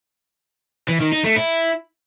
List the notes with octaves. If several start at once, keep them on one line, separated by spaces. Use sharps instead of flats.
E3
D#3
D#4
A3
E4